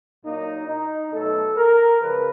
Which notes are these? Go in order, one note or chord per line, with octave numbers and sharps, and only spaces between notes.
A#2 F#3 A#3 D#4
D#4
B2 F#3 A3 A4
A#4
C#3 F3 G#3 B4